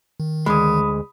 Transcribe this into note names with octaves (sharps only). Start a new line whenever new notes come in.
D#3
D2 G#3 B5 D#6